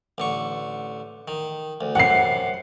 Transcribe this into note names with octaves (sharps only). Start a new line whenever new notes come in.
A1 D3 C#6
D#3
D2
F#2 C3 F#5 C7